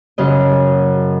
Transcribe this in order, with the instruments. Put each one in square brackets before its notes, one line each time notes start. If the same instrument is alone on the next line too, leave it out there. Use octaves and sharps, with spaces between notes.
[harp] F#2 C#3 D#5